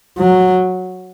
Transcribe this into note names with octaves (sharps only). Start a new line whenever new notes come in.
F#3